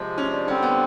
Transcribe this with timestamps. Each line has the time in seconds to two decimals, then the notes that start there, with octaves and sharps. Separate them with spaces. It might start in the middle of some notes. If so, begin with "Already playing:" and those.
Already playing: C3 F3 G#3 C4
0.18 C#4
0.33 D4
0.47 D3 G3 C4 C#4
0.63 B3